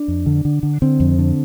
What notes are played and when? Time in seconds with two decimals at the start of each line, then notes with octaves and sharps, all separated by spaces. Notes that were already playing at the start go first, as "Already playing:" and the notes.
Already playing: D4
0.08 F2
0.26 D3
0.45 D3
0.63 D3
0.82 D3 C4
1.00 F2
1.19 D3